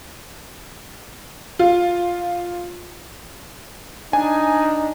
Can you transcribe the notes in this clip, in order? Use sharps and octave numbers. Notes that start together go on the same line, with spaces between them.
F4
D4 D#4 G#5